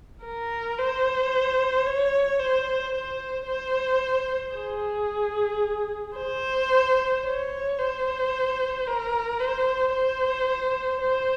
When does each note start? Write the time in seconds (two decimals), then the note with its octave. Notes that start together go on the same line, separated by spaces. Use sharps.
0.24 A#4
0.78 C5
1.87 C#5
2.40 C5
2.95 C5
3.48 C5
4.55 G#4
6.17 C5
7.25 C#5
7.78 C5
8.87 A#4
9.40 C5
9.94 C5
11.01 C5